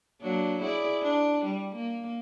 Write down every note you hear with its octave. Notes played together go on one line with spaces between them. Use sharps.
F#3 A#3 D4
E4 G#4 D5
D4
G3
A#3